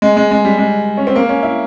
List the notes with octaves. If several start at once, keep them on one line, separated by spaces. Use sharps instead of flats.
G#3
G#3
G#3
G3
G#3
C#4
C4
A#3
C#4
E4